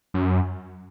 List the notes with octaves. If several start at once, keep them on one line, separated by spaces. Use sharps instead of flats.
F#2